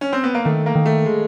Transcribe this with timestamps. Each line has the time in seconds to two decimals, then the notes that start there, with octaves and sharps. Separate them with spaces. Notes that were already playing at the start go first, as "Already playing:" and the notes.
0.01 C#4
0.13 C4
0.24 B3
0.34 A#3
0.45 D#3 A3
0.66 A#3
0.75 D#3
0.86 A3
1.06 G#3